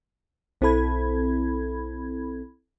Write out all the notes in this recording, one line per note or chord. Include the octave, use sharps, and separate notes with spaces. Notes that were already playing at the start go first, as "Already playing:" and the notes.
B1 C4 E4 A4 B5 G#6